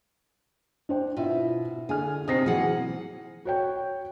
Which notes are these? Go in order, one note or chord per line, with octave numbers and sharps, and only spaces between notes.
D4 C5 G5
B2 E4 F4 E5
D3 G#4 G#5 F6
C3 C4 D#4 D#6 A#6 C7
B2 E3 F#3 G#4 F#5
F#4 C#5 G5